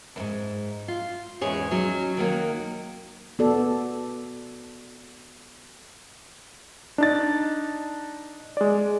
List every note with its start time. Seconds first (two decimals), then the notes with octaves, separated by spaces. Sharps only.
0.16 E2 G#2
0.88 F4
1.41 E2 G#2 C#4 G#4 C#5
1.71 F#3 C#4 D#4
2.17 D#3 F#3 A#3
3.39 B3 F#4 A4 D5
6.98 D4 D#4 A6
8.57 G#3 D5